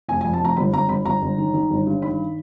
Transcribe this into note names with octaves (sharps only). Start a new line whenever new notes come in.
F1 G#5
G#5
F2
A5
F1 A#5
G1 B5
G1 A#5
G1 B5
G1 A#5
G1
D#3
D#3
G1
G2
D#3 B5